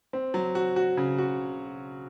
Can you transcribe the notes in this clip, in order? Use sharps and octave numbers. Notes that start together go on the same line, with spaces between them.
C4
F#3
F#4
F#4
C#3
F#4